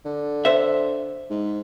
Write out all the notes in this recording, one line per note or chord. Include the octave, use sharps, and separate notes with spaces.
D3
C5 E5
G#2